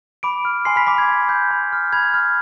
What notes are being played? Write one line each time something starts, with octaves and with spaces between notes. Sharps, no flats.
B5 D6 D7
F6
G#5 C6 C7
B5 B6
B5 D6 B6
G#6
C6
G6
B5
F6
B5 G#6
F6